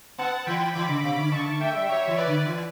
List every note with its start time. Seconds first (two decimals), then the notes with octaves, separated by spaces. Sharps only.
0.18 B3 F#5 A5
0.46 E3 G5 B5
0.75 E3 B5 D6
0.89 C#3
1.03 B2 B5 D6
1.17 D3
1.32 C#3 A5 C#6
1.46 D3
1.60 A3 E5 G5
1.74 G3
1.89 F#3 C#5 E5
2.07 E3
2.17 B4 D5
2.26 D3
2.46 E3